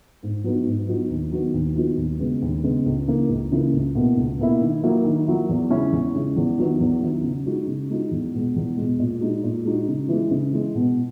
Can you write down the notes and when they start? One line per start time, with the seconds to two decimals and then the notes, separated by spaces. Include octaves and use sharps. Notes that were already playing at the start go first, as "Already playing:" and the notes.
0.23 G#2
0.44 F#3 B3 D#4 F#4
0.66 G#2
0.88 F#3 B3 D#4 F#4
1.10 D#2
1.31 D#3 F#3 B3 F#4
1.54 D#2
1.76 D#3 F#3 B3 F#4
1.97 D#2
2.20 C#3 G#3 B3
2.42 D#2
2.63 C#3 G#3 B3
2.86 C#2
3.07 C#3 E3 A#3
3.29 C#2
3.52 C#3 E3 A#3
3.73 C#2
3.95 B2 A#3 E4
4.17 C#2
4.39 B2 A#3 E4
4.61 D#3
4.83 F#3 A#3 E4
5.04 D#3
5.27 F#3 A#3 E4
5.49 E2
5.70 C#3 G#3 C#4 E4
5.92 E2
6.14 C#3 G#3 C#4 E4
6.36 E2
6.58 D#3 F#3 B3 E4
6.80 E2
7.02 D#3 F#3 B3 E4
7.23 C#3
7.46 G#3 D#4 F#4
7.67 C#3
7.90 G#3 D#4 F#4
8.11 E2
8.34 B2 G#3
8.56 E2
8.77 B2 G#3
8.99 A#2
9.21 G#3 D#4 F#4
9.44 A#2
9.65 G#3 D#4 F#4
9.88 C#3
10.09 E3 G#3
10.31 C#3
10.53 E3 G#3
10.75 B2